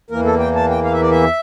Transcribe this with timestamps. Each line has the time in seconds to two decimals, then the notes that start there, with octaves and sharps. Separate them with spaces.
0.10 E2 E3 A#3 A#4
0.25 A4
0.39 G5
0.55 A5
0.70 G5
0.84 F5
0.92 E5
1.02 D5
1.10 E5